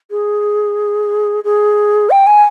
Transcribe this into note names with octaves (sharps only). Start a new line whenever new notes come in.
G#4
G#4
G5
G#5